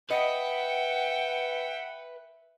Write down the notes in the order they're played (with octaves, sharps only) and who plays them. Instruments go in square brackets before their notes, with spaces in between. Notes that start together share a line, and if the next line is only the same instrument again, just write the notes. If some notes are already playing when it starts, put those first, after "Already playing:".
[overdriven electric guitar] B4 [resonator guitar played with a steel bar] D#5 [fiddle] E5 G5 [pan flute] F#5